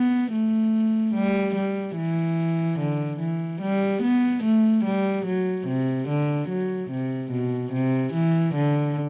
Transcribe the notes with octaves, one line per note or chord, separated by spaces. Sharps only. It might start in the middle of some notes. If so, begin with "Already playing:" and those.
Already playing: B3
A3
G3
G3
E3
D3
E3
G3
B3
A3
G3
F#3
C3
D3
F#3
C3
B2
C3
E3
D3